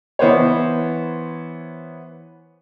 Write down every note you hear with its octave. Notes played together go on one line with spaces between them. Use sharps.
E3 B3 C5 C#5